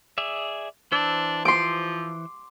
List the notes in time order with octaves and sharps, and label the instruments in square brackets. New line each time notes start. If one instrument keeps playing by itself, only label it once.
[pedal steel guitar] G#4 D5 E5
[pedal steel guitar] E3 C5 E6 [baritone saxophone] D4
[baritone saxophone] F3 [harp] C6 D6